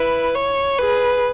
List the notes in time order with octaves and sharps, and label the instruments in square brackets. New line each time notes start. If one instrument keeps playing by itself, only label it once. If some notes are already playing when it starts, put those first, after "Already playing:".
Already playing: [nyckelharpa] E4 [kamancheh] B4
[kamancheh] C#5
[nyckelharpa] G#4 [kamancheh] B4